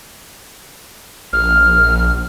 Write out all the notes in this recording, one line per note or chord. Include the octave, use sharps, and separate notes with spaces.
A#1 F6